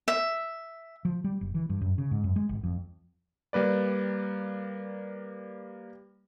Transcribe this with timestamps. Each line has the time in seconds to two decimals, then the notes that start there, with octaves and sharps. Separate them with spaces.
0.08 E5
1.05 F3
1.24 G3
1.41 F#1
1.54 E3
1.69 G2
1.81 F#2
1.98 C#3
2.11 G#2
2.24 F#2
2.36 G#3
2.49 G#1
2.63 F2
3.53 G3 A#3 B4 D5